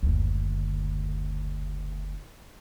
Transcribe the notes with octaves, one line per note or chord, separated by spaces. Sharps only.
F#1 D2